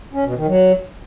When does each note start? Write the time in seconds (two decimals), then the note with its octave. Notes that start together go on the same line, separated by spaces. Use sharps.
0.13 C#4
0.25 B2
0.36 D#3
0.47 F#3